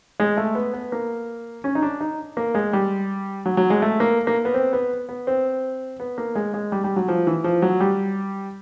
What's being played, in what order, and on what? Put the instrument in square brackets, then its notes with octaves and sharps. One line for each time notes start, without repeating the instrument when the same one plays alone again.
[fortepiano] G#3
A3
B3
B3
A#3
C#4
D#4
D4
D#4
A#3
G#3
G3
F#3
F#3
G#3
A3
A#3
A#3
B3
C4
B3
B3
C4
B3
A#3
G#3
G#3
G3
G3
F#3
F3
E3
F3
F#3
G3